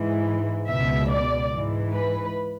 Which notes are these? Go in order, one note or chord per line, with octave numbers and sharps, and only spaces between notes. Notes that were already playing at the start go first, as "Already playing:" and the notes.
Already playing: G#2 E3
C#2 B2 E5
D5
G#2 E3
B4